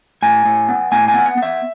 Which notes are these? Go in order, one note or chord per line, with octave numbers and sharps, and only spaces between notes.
A2 G#5
A2
B3
A2 G#5
G#5
B3
F#5
B3
E5